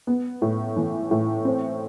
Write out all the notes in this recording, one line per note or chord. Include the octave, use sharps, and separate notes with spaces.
B3
A2
E3
A2
C4